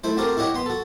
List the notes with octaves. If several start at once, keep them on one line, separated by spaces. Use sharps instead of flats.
A3 E4 C5
C4 F#4 G4 A4 A#4
E4 G4 C#5 D#5 F#5
B3 C6
F#4 A4